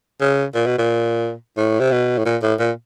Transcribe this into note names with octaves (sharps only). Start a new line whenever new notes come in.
C#3
A#2
B2
A#2
A2
C3
B2
A2
A#2
A2
A#2